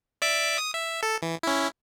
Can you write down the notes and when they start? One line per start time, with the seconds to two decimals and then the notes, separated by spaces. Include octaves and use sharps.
0.22 D5 E5 D6
0.58 D#6
0.74 E5
1.03 A4
1.22 E3
1.43 C#4 E4